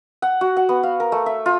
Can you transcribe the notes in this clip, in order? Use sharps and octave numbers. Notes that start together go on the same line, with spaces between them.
F#5
F#4
F#5
B3
F5
A#4
A3
E5
F4